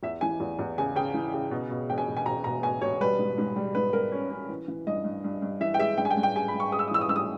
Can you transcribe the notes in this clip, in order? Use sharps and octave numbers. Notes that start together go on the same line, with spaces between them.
E2 E5
E3 G#5
E2
E2
C#3 G#5
C#3 G5
E3
C#3
B2
B2
E1 G5
G#5
E1
G#5
E1 A#5
B2 A#5
B2 G#5
E1 C#5
G3 B4
G#2
G#2
G3
G#2 B4
G3 A#4
C#4
C#4
E3
E3
G2 D#5
G2
G2
G2
E3 E5
G5
G#3 E5
G2 G5
G#5
G5
G2
G5
G#3 G#5
B5
G2
C#6
G#3 D#6
E6
D#6
E3 E6
D#6
G2 E6
D#6